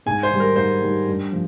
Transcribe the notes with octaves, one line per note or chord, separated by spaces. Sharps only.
G#2 G#5
C5
D#3 G3
A#4
G#2 C5
D#3 G3
G2
F3